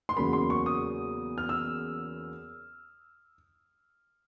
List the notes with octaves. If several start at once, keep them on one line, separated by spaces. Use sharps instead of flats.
C6
E2 C#3 F#3 A#3 B5
C6
C#6
D#6
F6
E6